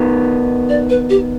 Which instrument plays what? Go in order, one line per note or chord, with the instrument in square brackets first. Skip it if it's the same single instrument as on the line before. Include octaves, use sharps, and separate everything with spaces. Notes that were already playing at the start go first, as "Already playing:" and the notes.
Already playing: [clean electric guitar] D#3 B3 D#4
[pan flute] D5
B4
G4